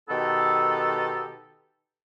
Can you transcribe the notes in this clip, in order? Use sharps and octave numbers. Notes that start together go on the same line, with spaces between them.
B2 D#3 B3 D#4 G4 A4